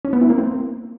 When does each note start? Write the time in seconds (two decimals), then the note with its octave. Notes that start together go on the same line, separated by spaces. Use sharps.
0.05 C#4
0.13 B3
0.21 E4
0.30 A#3
0.38 C4